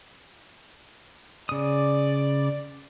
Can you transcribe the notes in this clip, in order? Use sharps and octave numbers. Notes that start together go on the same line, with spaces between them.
C#3 D5 D#6